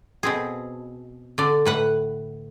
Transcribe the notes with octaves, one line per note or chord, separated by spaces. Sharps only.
B2 C4 G#4
D3 D5
A2 B4 F#5